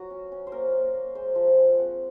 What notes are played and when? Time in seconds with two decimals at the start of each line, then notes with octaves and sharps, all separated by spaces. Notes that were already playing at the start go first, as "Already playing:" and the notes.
Already playing: F#3 F#4
0.10 C#4
0.32 C#4
0.47 C5
0.52 A#3 A#4
0.73 A#3
0.94 A#3
1.15 G#3 C5
1.35 F3
1.47 F5
1.57 G#3
1.78 C4 F#5